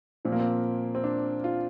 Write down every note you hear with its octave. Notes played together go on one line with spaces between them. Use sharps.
A#2 F3 C4
A#3
C4
C4
D4
F4